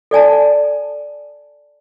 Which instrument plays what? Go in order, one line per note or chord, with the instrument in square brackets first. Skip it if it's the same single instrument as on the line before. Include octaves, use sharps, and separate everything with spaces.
[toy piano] A4 D5 G#5 A5